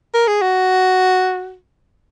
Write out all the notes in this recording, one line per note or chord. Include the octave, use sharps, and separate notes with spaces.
A#4
G#4
F#4